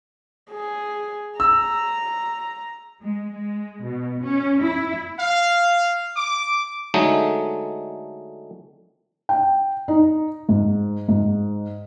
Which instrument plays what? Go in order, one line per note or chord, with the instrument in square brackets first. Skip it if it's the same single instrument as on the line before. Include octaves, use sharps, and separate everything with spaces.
[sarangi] G#4
[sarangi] A#5 [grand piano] E6
[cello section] G#3
G#3
B2
C#4
E4
[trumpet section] F5
D6
[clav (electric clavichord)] D3 F#3 G#3 A3 D#4
[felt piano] G5
D#4
G#2
G#2